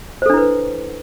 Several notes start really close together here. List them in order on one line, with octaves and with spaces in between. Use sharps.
C5 A4 D4 E4 B4